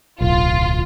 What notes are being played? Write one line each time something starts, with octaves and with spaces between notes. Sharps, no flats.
D1 B1 F4